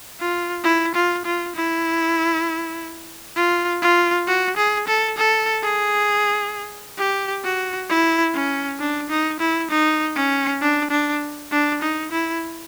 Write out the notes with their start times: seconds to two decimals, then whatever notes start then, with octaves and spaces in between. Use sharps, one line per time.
0.20 F4
0.64 E4
0.95 F4
1.25 F4
1.56 E4
3.36 F4
3.82 F4
4.27 F#4
4.57 G#4
4.88 A4
5.18 A4
5.63 G#4
6.98 G4
7.44 F#4
7.89 E4
8.34 C#4
8.79 D4
9.10 D#4
9.40 E4
9.70 D#4
10.16 C#4
10.61 D4
10.91 D4
11.51 D4
11.82 D#4
12.12 E4